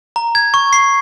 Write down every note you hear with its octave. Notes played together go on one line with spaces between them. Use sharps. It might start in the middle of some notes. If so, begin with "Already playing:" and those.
A#5
G#6
C#6
C7